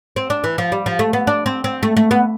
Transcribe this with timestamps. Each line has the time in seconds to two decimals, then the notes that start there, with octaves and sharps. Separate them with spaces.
0.16 C4
0.30 D4
0.44 E3
0.58 F3
0.72 G3
0.86 F3
0.99 A3
1.13 B3
1.27 D4
1.46 C4
1.64 C4
1.83 A3
1.97 A3
2.11 B3